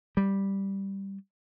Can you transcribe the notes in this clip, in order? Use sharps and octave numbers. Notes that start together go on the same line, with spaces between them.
G3